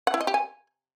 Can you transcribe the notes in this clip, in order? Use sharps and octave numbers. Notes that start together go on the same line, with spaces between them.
F#5
E4
D#5
G4
G#5